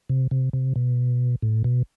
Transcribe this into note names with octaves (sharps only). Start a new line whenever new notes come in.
C3
C3
C3
B2
A2
B2